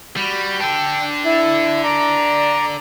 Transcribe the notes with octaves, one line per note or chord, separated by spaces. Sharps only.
G3 F#4 B5
D4 A4 G5
E4
D5 A#5